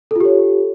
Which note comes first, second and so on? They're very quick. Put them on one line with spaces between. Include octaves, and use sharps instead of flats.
A4 F4 G4 C#5